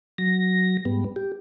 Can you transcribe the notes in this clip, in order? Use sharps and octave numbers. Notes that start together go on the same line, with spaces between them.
F#3 A#6
G#2 G3 B3
G4